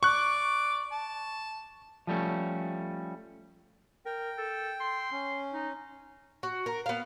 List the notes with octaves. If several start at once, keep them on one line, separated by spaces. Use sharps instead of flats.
D5 C#6 D6 F#6
A5
F3 G3 A3 C#4
A#4 G5
A4
C6
C#4
D#4
F#4
A#4
B3 F5